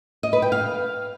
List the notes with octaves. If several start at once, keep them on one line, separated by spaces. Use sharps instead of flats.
D#5
B4
G5
F5